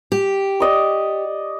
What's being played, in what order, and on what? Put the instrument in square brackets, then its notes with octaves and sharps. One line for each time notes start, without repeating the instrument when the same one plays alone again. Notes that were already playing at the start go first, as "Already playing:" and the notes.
[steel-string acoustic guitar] G4
[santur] D5 D#5 C#6